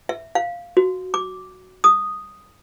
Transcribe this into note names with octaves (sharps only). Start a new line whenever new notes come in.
E5
F5
F#4
D6
D#6